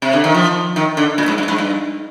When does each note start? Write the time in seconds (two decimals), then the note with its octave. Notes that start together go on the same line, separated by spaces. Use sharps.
0.02 C3
0.13 D3
0.24 D#3
0.34 F3
0.76 D#3
0.97 D3
1.18 A#2
1.28 G#2
1.38 G2
1.48 G#2
1.58 G2